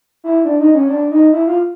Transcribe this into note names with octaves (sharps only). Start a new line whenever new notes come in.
E4
D4
D#4
C#4
D4
D#4
E4
F4